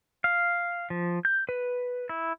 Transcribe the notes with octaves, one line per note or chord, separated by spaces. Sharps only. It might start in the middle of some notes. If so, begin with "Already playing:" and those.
F5
F3
G6
B4
E4